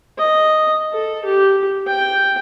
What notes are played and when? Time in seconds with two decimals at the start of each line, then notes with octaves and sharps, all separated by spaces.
0.18 D#5
0.92 A4
1.25 G4
1.87 G5